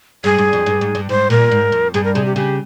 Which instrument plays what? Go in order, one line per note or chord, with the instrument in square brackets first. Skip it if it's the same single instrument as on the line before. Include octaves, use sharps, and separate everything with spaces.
[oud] G2 [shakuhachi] G#4
[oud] G2
F2
G2
G#2
G2
[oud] G#2 [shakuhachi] C5
[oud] A#2 [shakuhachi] A#4
[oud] G#2
F2
[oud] G2 [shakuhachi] G#4
[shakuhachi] A#4
[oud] C3 [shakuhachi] G#4
[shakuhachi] G4
[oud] C#3 [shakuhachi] G4